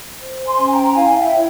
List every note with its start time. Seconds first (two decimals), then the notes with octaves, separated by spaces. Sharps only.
0.21 C5
0.45 G#5 C6
0.58 C#4
0.70 G5 A#5
0.94 E4 F5 G#5
1.19 E5 G5
1.30 C#5